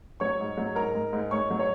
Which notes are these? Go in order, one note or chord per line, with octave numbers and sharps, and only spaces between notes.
F#3 C#5 C#6
G#2
F#3
G#2 A#4 A#5
G#2
G#2
G#2 C#5 C#6
F#3
C#5